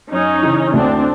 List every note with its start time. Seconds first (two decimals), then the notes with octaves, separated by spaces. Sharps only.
0.11 F#2 C#4 D#4
0.42 C#3 E3
0.73 D2 C4 D4